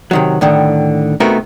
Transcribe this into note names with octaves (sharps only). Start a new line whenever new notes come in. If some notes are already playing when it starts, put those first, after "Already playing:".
C3 D#3 F#3
A2 D3 D#3
C3 A3 B3 D#4 F#4 A#4